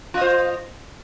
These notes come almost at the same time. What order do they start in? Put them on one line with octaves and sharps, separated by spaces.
F4 D#5 C5